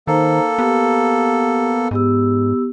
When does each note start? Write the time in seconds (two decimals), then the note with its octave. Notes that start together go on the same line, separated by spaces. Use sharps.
0.07 D#3 A#3 D#4 A4 C5 A#5
0.58 B3 G4
1.91 G#2 B3 G4 E6